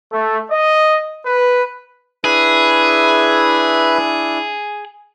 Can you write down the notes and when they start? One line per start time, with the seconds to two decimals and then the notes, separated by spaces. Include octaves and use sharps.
0.12 A3
0.50 D#5
1.25 B4
2.24 D4 E4 G#4 B4 E5